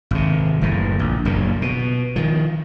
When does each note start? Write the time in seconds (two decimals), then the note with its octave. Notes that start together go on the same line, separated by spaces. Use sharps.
0.11 G#1 C3
0.61 F#1 A2 E3
0.99 A#1
1.25 F#1 F#2 A#2
1.62 B2
2.16 D#3 F3